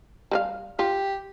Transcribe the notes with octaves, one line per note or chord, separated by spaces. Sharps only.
G3 B4 F5
F4 G4